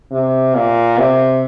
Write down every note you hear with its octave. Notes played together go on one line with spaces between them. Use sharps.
C3
A#2
C3